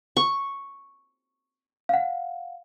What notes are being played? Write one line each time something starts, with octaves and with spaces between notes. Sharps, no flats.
C#6
F5 F#5